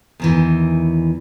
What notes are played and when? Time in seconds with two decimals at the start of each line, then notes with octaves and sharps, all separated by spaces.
0.20 E2 D#3 E3